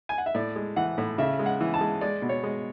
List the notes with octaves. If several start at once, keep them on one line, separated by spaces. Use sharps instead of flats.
G#5
F#5
E5
A2 D5
G#3
E3 F#5
A2
C#3 E5
G#3
F#5
E3
A5
G#3
G#3 D5
B2
C#5
G#3